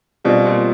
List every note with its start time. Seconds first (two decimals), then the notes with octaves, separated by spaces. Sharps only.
0.25 B2 G3 C4 F4
0.45 A#2